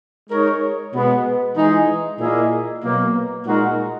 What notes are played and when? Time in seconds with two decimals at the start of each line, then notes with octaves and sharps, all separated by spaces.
0.30 G#3 D#4 A#4 C#5
0.94 B2 G#3 B3
1.56 E3 G#3 D#4 G#4
2.20 A#2 A#3 E4 G#4 D#5
2.83 B2 F#3 A#3
3.46 A#2 G#3 D#4 F#4 A#4